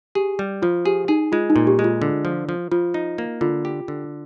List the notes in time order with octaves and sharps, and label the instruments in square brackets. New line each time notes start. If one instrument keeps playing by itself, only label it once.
[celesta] G4 [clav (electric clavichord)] G#4
[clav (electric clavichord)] G3
[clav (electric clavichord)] F3 [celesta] F4
[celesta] G4 [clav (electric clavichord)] G#4
[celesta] D#4 [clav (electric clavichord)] G#4
[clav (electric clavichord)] G#3 [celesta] F4
[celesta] D#4
[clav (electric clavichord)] A#2
[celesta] G4
[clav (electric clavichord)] G#3
[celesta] F4
[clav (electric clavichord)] D3
F3
F3
[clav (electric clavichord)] F3 [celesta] F4
[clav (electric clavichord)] D#4
A#3
[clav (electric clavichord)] D3 [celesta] F4
[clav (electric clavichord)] G4
D3